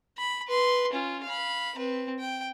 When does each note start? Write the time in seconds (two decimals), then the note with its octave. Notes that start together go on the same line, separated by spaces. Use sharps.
0.18 B5
0.48 B4 C6
0.93 C#4 F4
1.24 F5 B5
1.76 C4 B4
2.19 G5